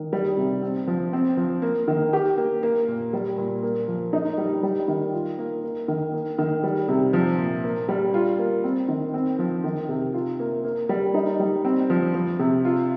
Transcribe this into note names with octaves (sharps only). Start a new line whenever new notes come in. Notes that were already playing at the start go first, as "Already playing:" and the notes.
Already playing: D#3
G3
C3
C4
F3
C4
F3
A#3
D#3
G4
A#3
A#3
A#2
G3
A#2
A#3
F3
D#4
G3
G3
D#3
F4
A#3
A#3
D#3
A#3
D#3
G3
C3
F3
A#2
A#3
G3
F4
A#3
C4
D#3
C4
F3
D#3
C3
F4
A#3
A#3
G3
D#4
G3
C4
F3
F3
C3
F4